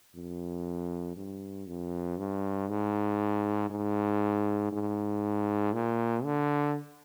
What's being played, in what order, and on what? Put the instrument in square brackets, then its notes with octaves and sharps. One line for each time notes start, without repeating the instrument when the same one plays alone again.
[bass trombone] F2
G2
F2
G2
G#2
G#2
G#2
A#2
D3